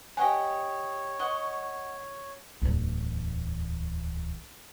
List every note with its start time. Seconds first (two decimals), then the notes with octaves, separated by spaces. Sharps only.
0.17 G4 C#5 D#5 F#5 G#5
1.19 D#5 F#5 C#6
2.62 D1 E2